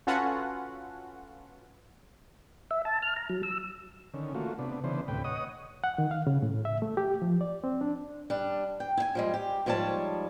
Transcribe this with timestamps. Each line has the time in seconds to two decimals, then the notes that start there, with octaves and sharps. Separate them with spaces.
0.07 C#4 F4 F#4 A4 B4 F#5
2.71 E5
2.85 A5
3.02 F6
3.16 A#5
3.29 F#3
3.43 E6
4.14 D3 D#3 C#4
4.34 A3 A#3 F4 F#4
4.59 C3 B3 D4
4.84 C#3 E3 B3 D4 C5
5.08 D2 A2 C3 B4 G5
5.24 C#5 D#5 F#5 D#6
5.84 F#5
5.98 D#3
6.11 F5
6.27 C#3
6.42 A2
6.65 E5
6.82 A3
6.97 G4
7.22 F3
7.41 D5
7.64 C4
7.81 D4
8.30 G3 D4
8.80 G5
8.97 E4 G#5
9.15 F3 G3 G#3
9.34 G4
9.66 G#2 F3 G3 C#5 A5